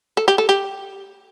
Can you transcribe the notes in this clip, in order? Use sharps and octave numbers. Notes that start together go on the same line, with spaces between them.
A4
G4
A4
G4